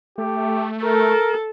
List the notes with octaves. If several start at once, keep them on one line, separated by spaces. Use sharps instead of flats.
A3 G4
A4 A#4